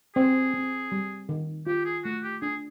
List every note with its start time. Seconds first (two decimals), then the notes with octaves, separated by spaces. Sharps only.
0.16 C4 G#4
0.54 C4
0.92 G3
1.29 D#3
1.67 F4 G4
1.85 G#4
2.04 A3 F#4
2.24 G4
2.42 D4 G#4